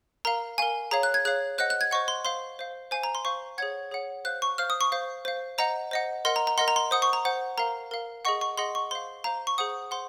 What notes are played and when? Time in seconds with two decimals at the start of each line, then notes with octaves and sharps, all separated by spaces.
0.25 A#4 F5 A#5
0.58 A#4 F5 G#5
0.91 G#4 C#5 F5 A#5
1.03 F#6
1.14 G#6
1.25 G#4 C#5 F5 F#6
1.58 C5 D#5 F#5 F#6
1.70 F#6
1.81 G#6
1.91 C5 D#5 F#5 C#6
2.08 C6
2.25 C5 F5 C6
2.59 C5 F5
2.91 C5 F5 G#5
3.03 A#5
3.15 C6
3.25 C5 F5 C#6
3.58 G#4 C#5 F#5 G#6
3.91 G#4 C#5 F#5
4.25 C5 F5 F#6
4.42 C#6
4.58 C5 F5 F6
4.70 D#6
4.81 C#6
4.92 C5 F5
5.25 C5 F5
5.58 C5 D#5 F#5 A#5
5.91 C5 D#5 F#5
6.25 A#4 D#5 F#5 C6
6.36 A#5
6.47 A#5
6.58 A#4 D#5 F#5 C6
6.68 A#5
6.76 C6
6.91 C5 F#5 D#6
7.02 C#6
7.13 A#5
7.25 C5 F#5
7.58 A#4 F5 A#5
7.91 A#4 F5
8.25 G#4 D#5 F#5 C#6
8.41 C#6
8.57 G#4 D#5 F#5 C6
8.75 C#6
8.91 C5 F5 C6
9.24 C5 F5 A#5
9.47 C#6
9.58 G#4 C5 F#5 D#6
9.91 C5 F#5 C6